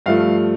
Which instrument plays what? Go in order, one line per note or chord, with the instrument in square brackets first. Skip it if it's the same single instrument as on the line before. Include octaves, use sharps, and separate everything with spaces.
[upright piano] G2 F3 A3 F5